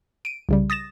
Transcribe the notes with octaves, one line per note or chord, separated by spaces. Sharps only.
D7 D#7
C2 C#3 G3
D#6 A6 A#6 E7